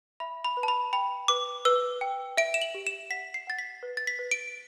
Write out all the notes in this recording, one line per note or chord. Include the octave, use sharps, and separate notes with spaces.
E5 B5
B5
B4
A5
B5
G5 B5
B4 D6
B4 E6
G5
E5 D7
E7
F#7
G4
E7
F#5 B6
C7
F#5 A6
B6
B4
A6
B6
B4
D7